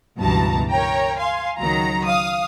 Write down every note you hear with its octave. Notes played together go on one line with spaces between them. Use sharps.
C#2 G2 B2 E3 A5 A#5
A#4 C#5 G5 A#5
F5 G#5 C6
C#2 D#3 F#3 A#5
F5 D#6